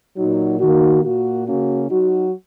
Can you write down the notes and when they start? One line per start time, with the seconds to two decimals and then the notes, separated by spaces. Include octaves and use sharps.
0.17 A#2 F#3 D#4 F#4
0.60 D#3 A#3 D#4 F#4
1.04 A#2 A#3 F#4
1.47 C#3 A#3 C#4 F#4
1.89 F#3 D#4 F#4